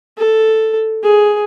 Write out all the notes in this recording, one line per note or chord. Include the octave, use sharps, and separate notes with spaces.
A4
G#4